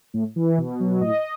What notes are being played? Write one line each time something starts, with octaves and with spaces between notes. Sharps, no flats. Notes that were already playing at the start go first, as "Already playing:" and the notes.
A2
E3
B2
F#3
A2 D#5